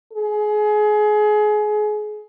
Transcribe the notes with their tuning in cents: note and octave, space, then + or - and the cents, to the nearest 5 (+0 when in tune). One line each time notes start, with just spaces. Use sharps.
G#4 +25